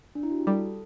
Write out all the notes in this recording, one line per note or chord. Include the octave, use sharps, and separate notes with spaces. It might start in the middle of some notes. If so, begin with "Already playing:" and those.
D4
E4
F#4
G4
G3 A4